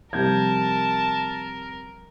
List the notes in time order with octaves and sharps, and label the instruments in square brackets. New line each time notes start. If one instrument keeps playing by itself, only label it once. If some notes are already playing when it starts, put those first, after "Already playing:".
[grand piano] C3 G6 G#6 [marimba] F3 G3 [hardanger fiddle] A#4 [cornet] A5